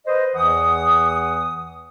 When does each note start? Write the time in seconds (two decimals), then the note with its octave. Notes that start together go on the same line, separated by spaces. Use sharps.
0.06 B4 C5 D#5
0.34 E2 E3 F#5 D#6